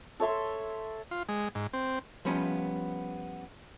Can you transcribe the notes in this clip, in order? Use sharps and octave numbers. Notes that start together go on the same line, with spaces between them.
A4 C#5 E5 C6
F4
G#3
G#2
C4
F3 G3 B3 C#4 F4